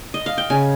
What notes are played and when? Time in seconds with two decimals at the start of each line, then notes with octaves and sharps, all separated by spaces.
0.14 D#5
0.26 F5
0.38 G5
0.50 C#3 G#5